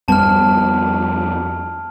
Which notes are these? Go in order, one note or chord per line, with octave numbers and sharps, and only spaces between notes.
F2 G3 B3 A5 F6